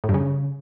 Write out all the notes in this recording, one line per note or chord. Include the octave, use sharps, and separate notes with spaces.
A2
G2
C#3